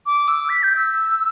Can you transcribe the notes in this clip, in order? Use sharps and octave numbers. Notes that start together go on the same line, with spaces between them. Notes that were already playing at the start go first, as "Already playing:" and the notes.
D6
E6
B6
G6
E6